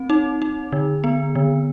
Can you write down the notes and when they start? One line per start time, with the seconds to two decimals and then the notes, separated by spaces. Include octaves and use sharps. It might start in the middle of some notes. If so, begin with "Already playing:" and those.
Already playing: C4
0.10 D#4
0.42 D#4
0.72 D3
1.04 B3
1.35 D3